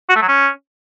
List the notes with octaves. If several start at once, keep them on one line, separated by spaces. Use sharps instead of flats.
F#4
A3
F#3
C#4